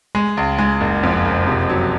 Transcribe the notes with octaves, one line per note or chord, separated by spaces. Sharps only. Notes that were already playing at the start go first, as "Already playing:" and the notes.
G#3
C#2
G#3
F#1
F2
F#1
C3
F#3